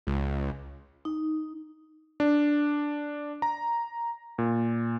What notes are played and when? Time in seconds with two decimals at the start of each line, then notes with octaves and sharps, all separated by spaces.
0.07 C#2
1.05 D#4
2.20 D4
3.42 A#5
4.38 A#2